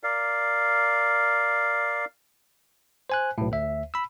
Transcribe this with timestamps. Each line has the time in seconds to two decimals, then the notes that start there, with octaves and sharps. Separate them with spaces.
0.04 A#4 D5 F5
3.10 C5 G#5 F#6
3.38 B1 A2
3.52 D2 E5
3.94 B5 E6